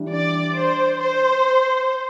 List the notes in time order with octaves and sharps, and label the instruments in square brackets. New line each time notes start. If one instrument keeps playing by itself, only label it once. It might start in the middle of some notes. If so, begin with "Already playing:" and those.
Already playing: [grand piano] E3 G3 D4
[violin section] D5
C5
C5